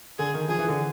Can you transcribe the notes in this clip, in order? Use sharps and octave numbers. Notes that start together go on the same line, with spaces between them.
D3 G#4
D#3
F3 G#4
E3
D3